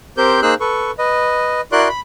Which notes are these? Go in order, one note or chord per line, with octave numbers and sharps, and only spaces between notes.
C4 G4 A#4 C5 G6
A#3 D#4 G#4 C5 E6 F#6
A4 B4 C#6
B4 D#5
E4 F#4 A#4 D5 C6 F#6
B5